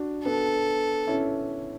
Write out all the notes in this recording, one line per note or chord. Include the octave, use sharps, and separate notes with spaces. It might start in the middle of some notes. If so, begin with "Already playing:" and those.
Already playing: D4 F#4
B3 D4 A4
C#4 E4